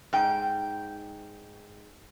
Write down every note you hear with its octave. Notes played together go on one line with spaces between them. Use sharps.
G#2 G5